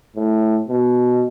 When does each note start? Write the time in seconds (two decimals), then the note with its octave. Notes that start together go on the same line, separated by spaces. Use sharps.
0.16 A2
0.68 B2